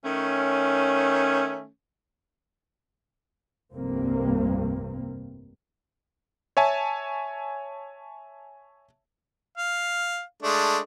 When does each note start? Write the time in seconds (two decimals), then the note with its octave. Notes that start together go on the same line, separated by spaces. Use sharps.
0.04 D#3 A3 C#4
3.74 F1 C2 G2 C3 A#3 C4
6.57 C#5 E5 G#5 A5
9.58 F5
10.43 G#3 A3 D4